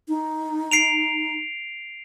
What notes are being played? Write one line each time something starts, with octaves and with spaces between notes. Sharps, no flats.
D#4
C7 D7 F7